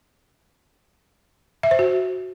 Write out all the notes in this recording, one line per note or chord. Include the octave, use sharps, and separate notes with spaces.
E5
C5
F#4